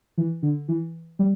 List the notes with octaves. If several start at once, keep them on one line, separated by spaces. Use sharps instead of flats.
E3
D3
E3
G3